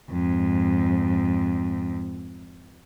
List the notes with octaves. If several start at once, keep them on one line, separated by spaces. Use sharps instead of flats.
F2 G#2